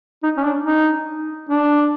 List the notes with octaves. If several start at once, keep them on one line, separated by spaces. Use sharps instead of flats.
D#4
C#4
D4
D#4
D4